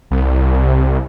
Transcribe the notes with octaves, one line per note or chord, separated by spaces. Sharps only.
C2